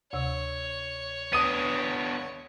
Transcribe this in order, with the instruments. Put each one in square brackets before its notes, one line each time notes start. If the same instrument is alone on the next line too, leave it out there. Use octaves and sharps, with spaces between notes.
[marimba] D2 C3 E6 [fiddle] C#5
[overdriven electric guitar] B3 D4 [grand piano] D#6 D#7